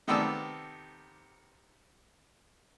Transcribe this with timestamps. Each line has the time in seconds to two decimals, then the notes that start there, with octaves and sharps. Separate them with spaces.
0.08 C3 D#3 B3 A4 D5 E6